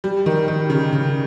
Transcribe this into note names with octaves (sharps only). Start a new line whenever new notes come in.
G3
D#3
D#3
C#3
C#3